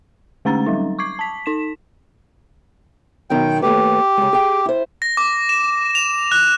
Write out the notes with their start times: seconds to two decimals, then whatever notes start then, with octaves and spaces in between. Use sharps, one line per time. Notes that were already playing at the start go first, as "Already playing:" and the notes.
0.45 D3 G#3 A3 C#4 A#5 A6
0.66 F#3 G3 D#4
0.99 C#6 D6 G#6 C7
1.19 A5 B6
1.46 D#4 B6 E7
3.30 F#2 B2 D#3 G5
3.62 D#2 A3 G4 B4
4.17 C#3 G#3
4.33 G#4 G5
4.66 E4 C5
5.02 A#6
5.17 D6
5.49 E7
5.95 F7
6.32 F#6